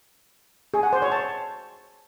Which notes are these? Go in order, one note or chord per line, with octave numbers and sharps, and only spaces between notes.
G#4
F#5
C5
C#5
A5